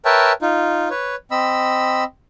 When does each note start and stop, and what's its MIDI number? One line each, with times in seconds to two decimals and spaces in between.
0.05 0.32 70
0.05 0.32 71
0.05 0.32 73
0.05 0.32 76
0.05 0.32 79
0.05 0.32 81
0.42 0.89 63
0.42 0.89 65
0.90 1.15 71
0.90 1.15 73
1.31 2.04 60
1.31 2.04 75
1.31 2.04 83
1.31 2.04 88